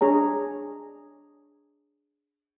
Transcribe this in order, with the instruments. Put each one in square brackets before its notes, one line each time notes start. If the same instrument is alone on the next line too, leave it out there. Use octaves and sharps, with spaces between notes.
[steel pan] D4 G#4 C#5 A#5